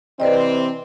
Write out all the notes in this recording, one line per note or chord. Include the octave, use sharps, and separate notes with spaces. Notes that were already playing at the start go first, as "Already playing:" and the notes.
C3 E3 C4 B4 D5 D#5